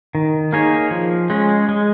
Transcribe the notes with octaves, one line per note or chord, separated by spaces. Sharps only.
D#3
A#3 D#4 G#4 C#5
F3
G#3 C#4
G#3